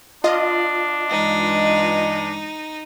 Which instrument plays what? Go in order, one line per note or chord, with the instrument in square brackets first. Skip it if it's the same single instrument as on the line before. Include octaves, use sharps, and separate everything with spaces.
[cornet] D4 [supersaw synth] F4 D#5
[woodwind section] G2 E3 G#3 [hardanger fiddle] D#4